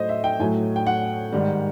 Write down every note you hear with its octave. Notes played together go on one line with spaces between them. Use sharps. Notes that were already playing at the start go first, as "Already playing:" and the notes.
Already playing: A2 F#3 A3 C5 D#5
E5
G5
A2 F#3 A3 G#5
G5
F#5
G#2 D#3 G3